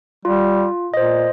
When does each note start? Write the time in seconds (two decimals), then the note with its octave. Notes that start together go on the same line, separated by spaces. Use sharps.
0.25 G3 F4
0.94 A#2 C5 D#5